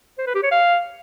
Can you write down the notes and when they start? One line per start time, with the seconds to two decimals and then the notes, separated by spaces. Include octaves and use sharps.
0.18 C5
0.26 B4
0.35 G4
0.43 C#5
0.51 F5